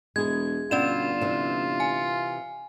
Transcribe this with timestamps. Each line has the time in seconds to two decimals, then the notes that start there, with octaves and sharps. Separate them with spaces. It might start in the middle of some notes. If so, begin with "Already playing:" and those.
0.16 E1 G#3 E4 G#4 G#6
0.71 G1 B2 B3 C#4 F4 D5 E7
1.21 C3 E3
1.80 G#5